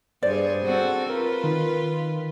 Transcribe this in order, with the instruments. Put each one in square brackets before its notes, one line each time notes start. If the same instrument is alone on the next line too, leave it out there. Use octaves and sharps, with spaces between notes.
[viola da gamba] G2 G#4 [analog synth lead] C5 [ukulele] D5
[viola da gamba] C4 F#4 A4
[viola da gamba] F4 B4 [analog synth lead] A#4
[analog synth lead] D#3